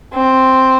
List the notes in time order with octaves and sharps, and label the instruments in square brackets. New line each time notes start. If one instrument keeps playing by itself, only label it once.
[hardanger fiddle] C4